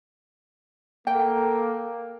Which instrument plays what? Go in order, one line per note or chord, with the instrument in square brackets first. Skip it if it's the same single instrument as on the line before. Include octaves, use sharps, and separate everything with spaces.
[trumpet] A#3 [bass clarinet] A4 [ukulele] G5